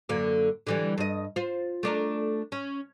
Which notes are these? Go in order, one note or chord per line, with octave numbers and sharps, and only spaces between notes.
F#2 D3 A#3
D3 E3 G3
G2 D#5
F4 C5
A3 D4 A#4
C#4